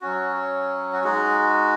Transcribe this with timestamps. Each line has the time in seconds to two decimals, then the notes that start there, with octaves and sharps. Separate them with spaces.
0.01 F#3 C#4 F#4
0.93 F#4
1.04 G#3 D#4 F#4 G#4